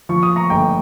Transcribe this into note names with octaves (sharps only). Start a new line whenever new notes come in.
F3 C#6
D#6
A#5 C#6
G1 G5 A#5